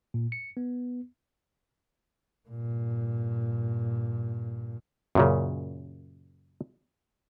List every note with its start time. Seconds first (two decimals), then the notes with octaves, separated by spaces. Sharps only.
0.14 A#2
0.32 C#7
0.57 B3
2.49 G2 A#2
5.15 F#2 A#2 C#3